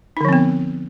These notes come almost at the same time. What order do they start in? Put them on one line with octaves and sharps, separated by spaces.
D#4 D3 F3 C4 B3